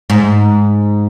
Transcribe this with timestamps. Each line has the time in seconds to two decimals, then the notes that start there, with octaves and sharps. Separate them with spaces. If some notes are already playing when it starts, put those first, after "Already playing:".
0.10 G#2